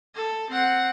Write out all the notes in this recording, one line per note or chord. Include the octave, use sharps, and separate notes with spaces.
A4
C4 F#5